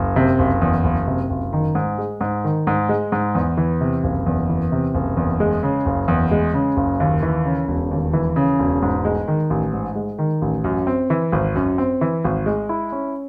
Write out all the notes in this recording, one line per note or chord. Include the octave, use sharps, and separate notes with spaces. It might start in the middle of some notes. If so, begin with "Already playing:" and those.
Already playing: F#1
C3
F#1
E2
F#1
C3
F#1
D#3
G#2
G#3
G#2
D#3
G#2
G#3
G#2
E2
E3
C3
F#1
E2
E3
C3
F#1
E2
G#3
C#3
F#1
E2
G#3
C#3
F#1
D#2
E3
C#3
E1
D#2
E3
C#3
E1
G#2
G#3
D#3
A1
G#2
G#3
D#3
A1
F#2
C4
E3
G#1
F#2
C4
E3
G#1
G#3
E4
C#4